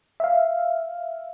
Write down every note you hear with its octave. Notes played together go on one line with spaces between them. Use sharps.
E5 F5